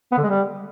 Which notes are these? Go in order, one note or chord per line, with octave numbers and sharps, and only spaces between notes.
B3
D3
G#3
G3